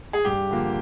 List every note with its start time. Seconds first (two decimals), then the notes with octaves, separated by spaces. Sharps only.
0.13 G#4
0.25 G2 G4
0.50 D3 F3 A#3